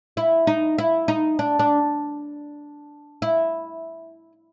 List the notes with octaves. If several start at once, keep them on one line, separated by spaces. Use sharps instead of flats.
E4
D#4
E4
D#4
D4
D4
E4